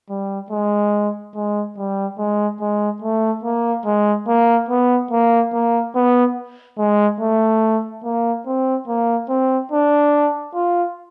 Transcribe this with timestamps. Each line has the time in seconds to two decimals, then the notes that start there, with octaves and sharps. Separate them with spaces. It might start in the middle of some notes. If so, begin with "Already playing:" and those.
0.10 G3
0.51 G#3
1.35 G#3
1.77 G3
2.18 G#3
2.60 G#3
3.02 A3
3.44 A#3
3.85 G#3
4.28 A#3
4.69 B3
5.11 A#3
5.53 A#3
5.95 B3
6.78 G#3
7.20 A3
8.04 A#3
8.46 C4
8.88 A#3
9.29 C4
9.72 D4
10.55 F4